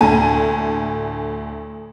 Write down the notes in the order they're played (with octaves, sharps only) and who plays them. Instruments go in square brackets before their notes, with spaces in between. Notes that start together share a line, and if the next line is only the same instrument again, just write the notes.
[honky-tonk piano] D2 A2 G#5 A5 D#7